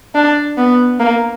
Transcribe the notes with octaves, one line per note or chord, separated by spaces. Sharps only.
D4
B3
A#3